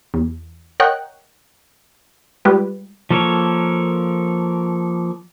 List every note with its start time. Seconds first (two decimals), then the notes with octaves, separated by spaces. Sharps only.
0.14 E2
0.80 A#4 C#5 D#5 F#5 G5 F#6
2.45 G3 G#3 F4 G4 B4
3.10 F3 A#3 A4 A#4 C#5